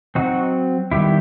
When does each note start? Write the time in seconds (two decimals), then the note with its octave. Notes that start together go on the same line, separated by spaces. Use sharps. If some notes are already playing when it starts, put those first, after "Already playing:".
0.15 F#3 C4 D#4 F#4
0.91 D#3 G3 B3 E4 G4